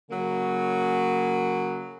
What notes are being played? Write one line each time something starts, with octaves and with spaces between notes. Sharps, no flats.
C#3 F#3 A#3